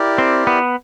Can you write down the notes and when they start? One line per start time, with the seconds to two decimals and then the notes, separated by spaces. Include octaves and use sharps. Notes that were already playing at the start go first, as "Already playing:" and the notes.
Already playing: E4 G4 A#4 D5
0.18 C4
0.47 B3